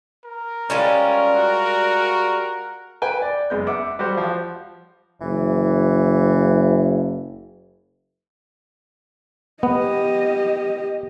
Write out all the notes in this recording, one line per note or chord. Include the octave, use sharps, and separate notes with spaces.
A#4
G3 G#3 C#4 F4
F#4
B4 G5 G#5
D5
F#1 G#3 B3 G6
E5 F#5 D6
G3 F#4 G4 C5
F3
F#1 E3
B3 G4 D#5